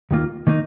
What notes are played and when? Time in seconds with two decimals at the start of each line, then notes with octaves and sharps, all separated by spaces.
0.11 D#2 D#3 A#3 F4
0.47 D#3 A#3 D#4